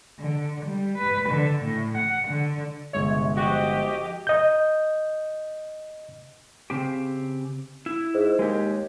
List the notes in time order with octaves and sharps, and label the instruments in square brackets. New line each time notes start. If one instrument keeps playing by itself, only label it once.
[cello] D3
G3
B4
D3
A2
F#5
D3
[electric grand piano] G1 G#3 E5 [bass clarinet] C3 [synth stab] C#5
[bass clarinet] F3 [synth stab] F#4 [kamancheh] G4 D#5
[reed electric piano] D#5 G6
[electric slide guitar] C#3 C4 G4
E4
[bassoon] G#2
[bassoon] D#2 [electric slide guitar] G#3 G4